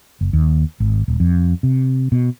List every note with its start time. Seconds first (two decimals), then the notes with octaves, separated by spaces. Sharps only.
0.21 F#1
0.33 D#2
0.80 G#1
1.08 D#1
1.20 F2
1.63 C3
2.12 B2